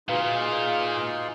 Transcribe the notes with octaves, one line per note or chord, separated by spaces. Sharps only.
A#2 D#4 F4 F#4 G#4 B4 F5